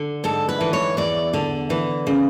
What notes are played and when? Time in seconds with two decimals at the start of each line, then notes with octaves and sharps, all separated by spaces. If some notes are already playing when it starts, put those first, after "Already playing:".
Already playing: D3
0.24 G#2 A4
0.49 B4
0.61 E3
0.73 C#5
0.97 E2 D5
1.34 D3
1.70 E3
2.07 C#3